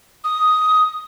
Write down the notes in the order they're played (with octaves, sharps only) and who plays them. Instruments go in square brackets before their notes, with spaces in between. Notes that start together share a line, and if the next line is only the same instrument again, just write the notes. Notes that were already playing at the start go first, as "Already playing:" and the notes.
[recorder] D#6